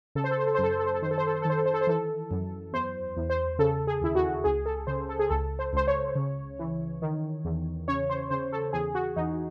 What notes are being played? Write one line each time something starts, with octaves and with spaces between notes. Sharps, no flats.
C#3 A4
C5
A4
C5
A4
C5
F#2
A4
C5
A4
C5
A4
D#3 C5
A4
C5
A4
C5
A4
D#3 C5
A4
C5
A4
C5
E3 A4
F#2
E2 C5
E2
C5
C#3 A4
G#4
D#2 E4
F#4
C#2 G#4
A4
C#3 C5
A4
G#4
C#2 A4
C5
C#2 C5
C#5
C#3
E3
D#3
E2
C#3 C#5
C5
C#3 C5
A4
E2 G#4
F#4
E2 D#4